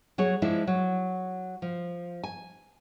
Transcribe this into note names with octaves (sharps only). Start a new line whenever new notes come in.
F#3 G#4 C#5
F3 G#3 D4 E4
F#3
F3
G#5